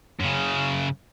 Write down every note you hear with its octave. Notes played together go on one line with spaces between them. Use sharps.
F#2 C#3